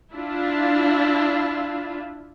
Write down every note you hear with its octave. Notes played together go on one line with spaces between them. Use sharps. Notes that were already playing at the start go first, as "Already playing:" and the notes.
D4 E4 F4